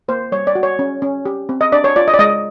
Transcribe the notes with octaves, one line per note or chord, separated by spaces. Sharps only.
A#3 C5
G3 C#5
D5
F#4
C#5
C#4
C#4
G4
C4
D#5
D4 D5
C#5
F4 D5
D#5
D5
G#3 D#5